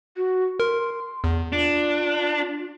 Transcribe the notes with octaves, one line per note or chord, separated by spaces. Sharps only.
F#4
A#4 C6
E2
D4 F4